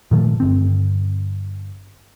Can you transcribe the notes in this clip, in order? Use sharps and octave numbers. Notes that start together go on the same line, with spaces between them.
A#2 D#3 F3 A3
G1 C4